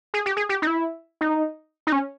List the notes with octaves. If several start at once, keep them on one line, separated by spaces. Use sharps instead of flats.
G#4
G4
G#4
G4
D#4
E4
D#4
D#4
C#4